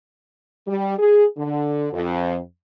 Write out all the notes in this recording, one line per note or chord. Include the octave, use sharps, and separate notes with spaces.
G3
G#4
D3
F2